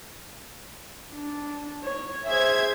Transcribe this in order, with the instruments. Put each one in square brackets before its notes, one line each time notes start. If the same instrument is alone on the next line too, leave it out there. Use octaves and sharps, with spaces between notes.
[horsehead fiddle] D4
C#5
[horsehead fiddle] G#4 C5 [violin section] E5 G#6